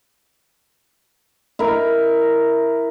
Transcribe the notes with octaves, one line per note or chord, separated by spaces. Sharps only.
E4 A#4